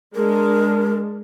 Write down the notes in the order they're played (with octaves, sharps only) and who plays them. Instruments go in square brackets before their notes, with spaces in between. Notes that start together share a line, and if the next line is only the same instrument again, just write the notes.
[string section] G#3 D4 [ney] A#4